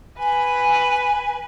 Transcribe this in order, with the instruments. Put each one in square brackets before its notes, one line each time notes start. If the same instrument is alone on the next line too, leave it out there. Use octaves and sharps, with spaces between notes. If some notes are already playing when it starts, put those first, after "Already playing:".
[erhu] B4 [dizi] G#5